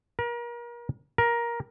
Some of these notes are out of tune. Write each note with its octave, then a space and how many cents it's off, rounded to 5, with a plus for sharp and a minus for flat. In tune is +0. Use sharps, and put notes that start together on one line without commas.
A#4 +35
A#4 +15